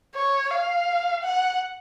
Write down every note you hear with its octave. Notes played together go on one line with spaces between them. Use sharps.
C#5
F5
F#5